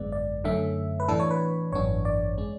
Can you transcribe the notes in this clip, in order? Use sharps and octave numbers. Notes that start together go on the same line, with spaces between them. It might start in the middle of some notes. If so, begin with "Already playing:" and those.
Already playing: G#1 F#2 D3 G#3 B3 D5
D5
F#2 D3 A3 C#4 E5
B4
A2 E3 B3 D4 A4
C#5
B4
G#1 F#2 E3 B3 D4 C#5
D5
G#3 C#4